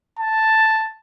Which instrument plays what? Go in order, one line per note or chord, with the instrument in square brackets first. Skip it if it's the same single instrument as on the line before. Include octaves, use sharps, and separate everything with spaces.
[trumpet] A5